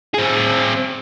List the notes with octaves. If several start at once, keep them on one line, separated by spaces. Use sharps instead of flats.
C4 G#4